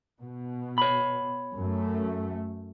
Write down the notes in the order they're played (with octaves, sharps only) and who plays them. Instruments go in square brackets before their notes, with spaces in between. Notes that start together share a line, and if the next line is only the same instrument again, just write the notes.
[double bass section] B2
[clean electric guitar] C#5 B5
[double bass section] F#2 A3